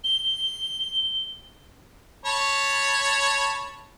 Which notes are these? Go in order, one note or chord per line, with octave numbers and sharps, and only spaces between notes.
G7
C#5 A5 B5